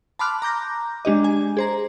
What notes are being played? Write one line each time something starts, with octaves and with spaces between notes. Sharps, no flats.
A5 B5 C6 D6 F6 F#6
A#5 D6 G6 A#6
G#3 D4 G4 D#5
G#5
G#4 C5 A#5